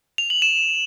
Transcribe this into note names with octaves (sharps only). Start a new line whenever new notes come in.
F7
F#7
E7